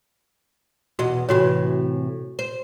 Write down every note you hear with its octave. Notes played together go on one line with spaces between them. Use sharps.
E2 B2 F#4 D#5
A2 C3 E3 F#4 C#5
C5